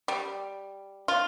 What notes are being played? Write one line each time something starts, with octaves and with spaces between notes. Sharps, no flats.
G3
F4